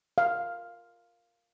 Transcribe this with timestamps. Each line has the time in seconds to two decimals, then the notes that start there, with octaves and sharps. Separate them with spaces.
0.18 F5